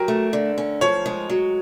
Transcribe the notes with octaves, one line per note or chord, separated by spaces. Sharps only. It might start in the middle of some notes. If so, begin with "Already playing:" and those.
Already playing: F#3 G4 A#4
A3
D3
C#4
F3 C#5
G#3
F#3